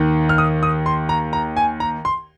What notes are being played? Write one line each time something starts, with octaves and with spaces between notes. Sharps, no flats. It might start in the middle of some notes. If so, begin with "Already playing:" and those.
Already playing: D#2 D#3
F6
D#6
D#6
C6
A#5
A#5
G#5
A#5
C6